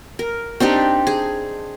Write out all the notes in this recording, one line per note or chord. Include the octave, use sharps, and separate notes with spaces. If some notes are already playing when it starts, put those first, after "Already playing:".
A#4
C4 D4 D#4 G4
G#4